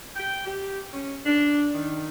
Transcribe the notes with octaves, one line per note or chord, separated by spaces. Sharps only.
G5
G4
C#4
D4
D#3